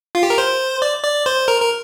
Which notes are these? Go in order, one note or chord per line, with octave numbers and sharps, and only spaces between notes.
F4
G4
A#4
C5
D5
D5
C5
A#4
A#4